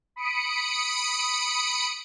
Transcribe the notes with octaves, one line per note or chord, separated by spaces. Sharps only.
B5 D#6 C#7 D7